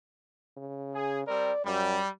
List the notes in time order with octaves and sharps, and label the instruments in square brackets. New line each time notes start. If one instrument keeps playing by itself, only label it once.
[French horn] C#3
[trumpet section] G#4
[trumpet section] G3 C4 A#4 [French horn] D5
[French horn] F#2 [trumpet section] G3